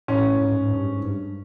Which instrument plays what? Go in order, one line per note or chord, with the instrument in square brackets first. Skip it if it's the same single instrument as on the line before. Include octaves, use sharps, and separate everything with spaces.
[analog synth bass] A2 [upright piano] C#4
[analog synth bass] G#2
G2
G#2
G2